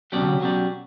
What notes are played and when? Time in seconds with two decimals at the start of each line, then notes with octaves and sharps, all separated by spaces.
0.12 B2 F#3 C#4 G4 D5
0.22 D3
0.32 C#3
0.41 B2 F#3 C#4 G4 D5